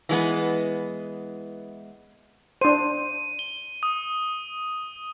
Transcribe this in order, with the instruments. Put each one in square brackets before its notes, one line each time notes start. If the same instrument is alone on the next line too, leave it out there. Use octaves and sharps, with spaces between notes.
[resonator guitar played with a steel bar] E3 G#3 B3
[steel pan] D4 C5 [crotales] D#7
[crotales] G7
D#6